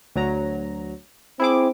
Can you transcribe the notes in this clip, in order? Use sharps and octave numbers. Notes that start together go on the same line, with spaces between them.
D2 F#3 A#5
C4 E4 G#4 D6